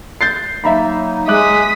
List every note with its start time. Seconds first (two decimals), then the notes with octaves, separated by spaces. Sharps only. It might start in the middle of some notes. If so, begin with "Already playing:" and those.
0.21 G6 A6 C7
0.64 F#3 A#3 D#4 E5 A#5 B5
1.28 G#3 E5 D6 D#6 F#6 B6